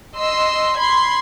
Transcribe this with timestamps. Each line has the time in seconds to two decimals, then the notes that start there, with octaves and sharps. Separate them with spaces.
0.17 D#5 C6 E6
0.77 B5 C6 G#6